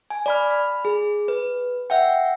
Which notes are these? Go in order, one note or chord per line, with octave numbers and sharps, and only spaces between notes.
G#5
D5 B5 F6
B5
G#4
B4
E5 F#5 G5